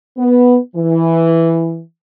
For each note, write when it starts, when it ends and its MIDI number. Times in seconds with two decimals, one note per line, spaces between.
0.17 0.58 59
0.76 1.81 52